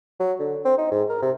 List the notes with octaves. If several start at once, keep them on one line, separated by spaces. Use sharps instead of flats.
F#3
D3
C4
D#4
G#2
A#4
C3